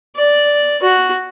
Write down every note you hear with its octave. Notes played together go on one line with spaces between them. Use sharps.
D5
F#4